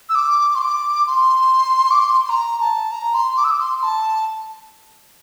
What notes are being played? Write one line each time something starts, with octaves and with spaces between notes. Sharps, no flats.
E6
D6
C6
D6
C6
D6
C6
C6
A#5
A5
A#5
C6
D6
E6
D6
C6
A5